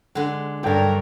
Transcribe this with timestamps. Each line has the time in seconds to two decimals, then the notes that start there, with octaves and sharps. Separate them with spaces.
0.15 D3 G#3 F#5
0.63 G2 F#3 F#4 A4 A#4 G5